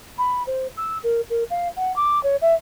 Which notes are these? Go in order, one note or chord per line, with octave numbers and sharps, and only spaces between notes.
B5
C5
E6
A#4
A#4
F5
F#5
D6
C#5
E5